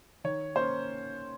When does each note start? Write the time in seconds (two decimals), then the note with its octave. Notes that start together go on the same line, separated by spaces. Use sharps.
0.24 D#3 C#5
0.56 A#3 C#4 C5